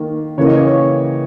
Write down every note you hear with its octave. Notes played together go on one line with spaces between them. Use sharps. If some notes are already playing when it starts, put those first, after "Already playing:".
Already playing: D#3 A#3
C#3 E3 A#3 C#5
D#5
C#5